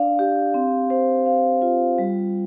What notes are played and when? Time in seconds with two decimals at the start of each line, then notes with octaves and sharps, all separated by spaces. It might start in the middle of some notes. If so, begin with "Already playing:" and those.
Already playing: D4 D5 F5
0.19 G4
0.54 C4
0.90 C5
1.26 F5
1.62 F4
1.98 G3